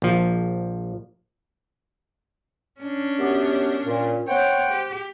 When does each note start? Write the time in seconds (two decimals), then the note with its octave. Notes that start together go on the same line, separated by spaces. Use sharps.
0.02 A#1 F3
2.81 C#4 D4
3.18 F#2 B3 G4
3.85 A#2
4.28 B3 C5 C#5 F#5 G5
4.70 G4